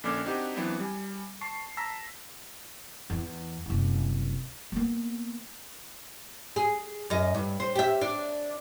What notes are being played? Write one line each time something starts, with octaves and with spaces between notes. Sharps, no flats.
A#1 D3 A#3 C#4 D6 G#6
C4 D4 D#4 F#4 G4
E3 F#3 B3 C4 D4 E4
G3 G#5
A5 C#6 C7
A5 A#5 E6 A#6 B6
E2
F#1 C2
A#3 B3
G#4
F#2 D#5
G2
C5
G4 E5
D4